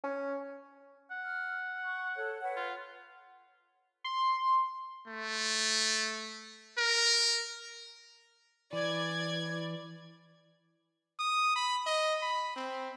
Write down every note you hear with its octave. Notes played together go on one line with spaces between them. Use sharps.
C#4
F#5
F6
C#6
A4 C#5
B4 C#5 F#5
F4
C6
A3
A#4
E3 D5 G#6
D#6
B5
D#5
B5
C4